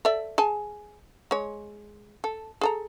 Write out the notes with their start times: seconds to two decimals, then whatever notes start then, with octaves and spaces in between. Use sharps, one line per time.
0.05 A4 D5 E5
0.38 G#4 G#5 A5
1.31 G#3 C#5
2.24 A4
2.61 G#4 A4 A#5